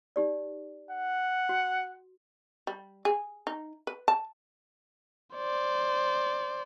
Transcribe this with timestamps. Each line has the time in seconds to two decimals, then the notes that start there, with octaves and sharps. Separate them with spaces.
0.16 D#4 G4 D5
0.91 F#5
1.49 F#4
2.67 G3
3.05 G#4
3.47 D#4
3.87 B4
4.08 A5
5.35 C5 D5